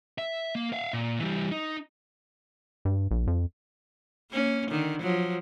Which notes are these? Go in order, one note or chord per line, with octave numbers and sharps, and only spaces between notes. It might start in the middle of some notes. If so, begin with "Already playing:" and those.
E5
A#3
E5 F5
A#2
E3 G3
D#4
G2
A#1
F2
A#3 C#4
D3 D#3
F3 F#3